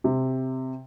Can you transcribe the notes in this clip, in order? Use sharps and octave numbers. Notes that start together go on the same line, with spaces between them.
C3